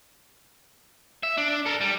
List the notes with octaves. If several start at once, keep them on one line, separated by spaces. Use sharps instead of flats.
E5
D4
A4 A#4
G3